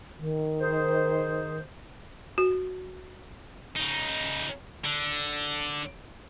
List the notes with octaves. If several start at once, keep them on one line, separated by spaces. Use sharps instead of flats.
D#3
D#4 G#4 C5
F#4
C#3 D#4
D3